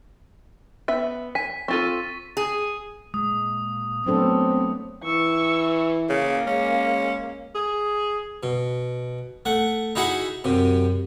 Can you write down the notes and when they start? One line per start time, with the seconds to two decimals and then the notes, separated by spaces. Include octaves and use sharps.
0.88 B3 E5
1.35 G#5 B6
1.68 C4 F4 A4 C#6 A6 D#7
2.37 G#4
3.14 A#2 G#3 D#6
4.07 F#3 A3 B3 C4 D4 A4
5.04 E3 C#6 E6
6.10 C#3 A#3
6.47 G#3 C#4
7.55 G#4
8.43 B2
9.45 A3 F#5
9.95 D#4 E4 F#4 G#4 F#5
10.44 F#2 C3